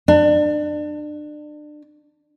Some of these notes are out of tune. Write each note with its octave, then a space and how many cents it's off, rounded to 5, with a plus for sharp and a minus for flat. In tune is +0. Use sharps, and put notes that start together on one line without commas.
D4 +30